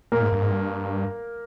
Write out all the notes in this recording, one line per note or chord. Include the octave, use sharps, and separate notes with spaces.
A#2 A#3 A#4
G#2
G2
G#2
G2